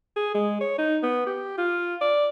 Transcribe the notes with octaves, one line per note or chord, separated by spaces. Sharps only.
G#4
G#3
C#5
D#4
B3
G4
F4
D5